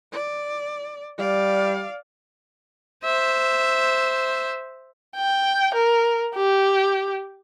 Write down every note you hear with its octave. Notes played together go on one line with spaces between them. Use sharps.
D5
G3 D5 F5
C5 E5
G5
A#4
G4